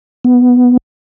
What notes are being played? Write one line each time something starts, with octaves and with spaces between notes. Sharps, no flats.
B3